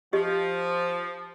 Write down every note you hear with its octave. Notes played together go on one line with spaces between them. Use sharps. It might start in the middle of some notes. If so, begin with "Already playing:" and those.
F3 G4 D#5